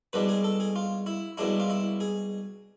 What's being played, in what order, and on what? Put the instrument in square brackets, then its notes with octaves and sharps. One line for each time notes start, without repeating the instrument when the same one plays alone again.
[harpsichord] C2 B2 G#3 D4 B4
G#4
A4
G#4
F4
E4
C2 B2 G#3 D4 E4
F4
E4
G#4